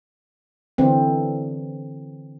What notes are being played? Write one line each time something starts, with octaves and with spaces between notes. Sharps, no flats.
D3 E3 C4